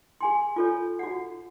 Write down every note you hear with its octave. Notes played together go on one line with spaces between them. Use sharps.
G#4 G#5 C6
F4 A4 C#5
F#4 F#5